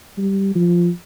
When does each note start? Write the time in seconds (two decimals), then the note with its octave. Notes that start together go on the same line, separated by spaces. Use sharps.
0.18 G3
0.55 F3